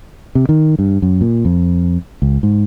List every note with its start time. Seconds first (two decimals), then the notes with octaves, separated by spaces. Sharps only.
0.35 C3
0.49 D#3
0.79 G2
1.02 F#2
1.21 A#2
1.45 F2
2.22 C#2
2.43 G#2